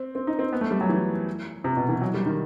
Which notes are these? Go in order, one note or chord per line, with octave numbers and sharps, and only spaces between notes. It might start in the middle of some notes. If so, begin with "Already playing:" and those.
Already playing: C4
C4
D#4
C4
B3
A3
G3
F#3
E3
C3
B2
E3
F#3
G3
D#3